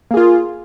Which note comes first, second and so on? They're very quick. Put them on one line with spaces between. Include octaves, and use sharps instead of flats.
A#3 G#4 F4